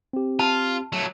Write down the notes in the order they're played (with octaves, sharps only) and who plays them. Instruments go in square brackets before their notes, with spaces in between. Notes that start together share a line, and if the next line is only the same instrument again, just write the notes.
[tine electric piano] C4 G4
[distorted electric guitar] F4 [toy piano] A5
[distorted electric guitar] F#3 A3